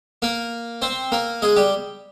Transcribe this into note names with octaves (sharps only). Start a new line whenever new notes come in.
A#3 A#4
C4 C5
A#3 A#4
G#3 G#4
G3 G4